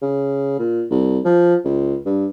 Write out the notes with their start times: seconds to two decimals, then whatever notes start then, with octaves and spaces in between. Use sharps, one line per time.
0.02 C#3
0.59 A#2
0.90 C2
1.25 F3
1.65 C#2
2.06 G2